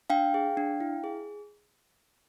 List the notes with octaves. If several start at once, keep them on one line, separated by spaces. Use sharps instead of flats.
D4 F5 G5
G#4
D4
E4
G#4